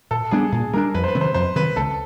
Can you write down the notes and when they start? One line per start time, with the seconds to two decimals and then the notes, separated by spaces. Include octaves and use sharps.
0.11 A#2 A4
0.31 G3 B3 D4 G#4
0.52 A#2 G#4
0.73 G3 B3 D4 A#4
0.94 F2 B4
1.04 C5
1.08 B4
1.15 C3 D#3 F#3
1.21 C5
1.34 F2 C5
1.56 C3 D#3 F#3 B4
1.76 C#2 A4